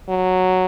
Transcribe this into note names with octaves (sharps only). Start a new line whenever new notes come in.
F#3